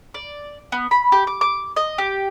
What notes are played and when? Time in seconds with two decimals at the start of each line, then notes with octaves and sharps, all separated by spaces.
0.14 D5
0.72 B3
0.91 B5
1.12 G4
1.27 D6
1.41 D6
1.76 D#5
1.98 G4